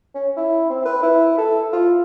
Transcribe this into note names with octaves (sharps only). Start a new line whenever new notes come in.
C#4
E4
C4
B4
E4
A4
F4